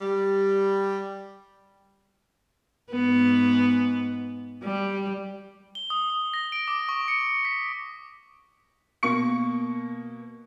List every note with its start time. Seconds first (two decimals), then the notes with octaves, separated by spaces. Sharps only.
0.02 G3
2.91 G#2 B3
4.64 G3
5.75 G7
5.90 D#6
6.10 D#6
6.34 A#6
6.52 D7
6.68 D6
6.89 C#6
7.08 C#7
7.45 B6
9.03 B2 A#3 C#6 C#7